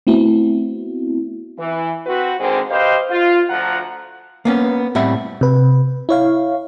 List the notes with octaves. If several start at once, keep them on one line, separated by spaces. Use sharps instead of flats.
A3 B3 C4 E4 F#4
E3
C4 F#4 B4
D3 D#3 G#3 C4
G4 B4 C5 D#5 F5
F4
D2 F3 F#5 A#5
A#3 B3 C#4
A2 G3 C4 E5 F#5 B5
C3 B4
E4 C#5 F5